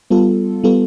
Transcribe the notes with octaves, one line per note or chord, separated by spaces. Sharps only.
G3 B3 F4 A4
G3 B3 F4 A4